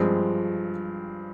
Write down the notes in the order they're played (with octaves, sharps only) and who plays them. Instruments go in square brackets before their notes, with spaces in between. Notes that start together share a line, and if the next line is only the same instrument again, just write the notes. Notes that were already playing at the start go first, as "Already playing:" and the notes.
Already playing: [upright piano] G2 F3 G#3 C4